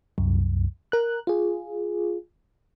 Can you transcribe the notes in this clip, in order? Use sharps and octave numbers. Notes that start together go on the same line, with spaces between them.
C2 F#2
A#4 F#6
F4 G#4